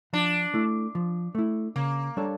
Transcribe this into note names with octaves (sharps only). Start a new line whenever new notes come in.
F3 D4
A3 E4
F3
A3 E4
C#3 A#3
G3 D4 A4 C#5